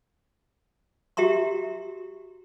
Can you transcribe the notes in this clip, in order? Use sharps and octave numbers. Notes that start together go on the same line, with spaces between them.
F#4 G4 E5 A#5 C6